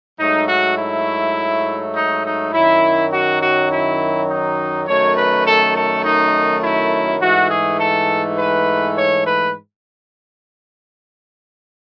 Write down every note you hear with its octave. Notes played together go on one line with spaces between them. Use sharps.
G#2 F#3 A3 D#4
F#4
E4
D#4
D#4
F#2 D#3 F#3 E4
F#4
F#4
E4
D#4
F#2 D#3 F#3 A3 C#5
B4
A4
A4
D#4
E4
G#2 E3 A3 F#4
G#4
A4
B4
C#5
B4